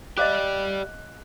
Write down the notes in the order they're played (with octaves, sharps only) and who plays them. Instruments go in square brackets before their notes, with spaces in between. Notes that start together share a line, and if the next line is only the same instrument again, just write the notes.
[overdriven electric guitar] G4 D5 [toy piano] D#5 F5 D6 [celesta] F#6